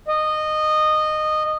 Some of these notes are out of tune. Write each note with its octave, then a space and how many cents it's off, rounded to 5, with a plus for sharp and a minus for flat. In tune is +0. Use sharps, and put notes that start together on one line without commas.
D#5 -15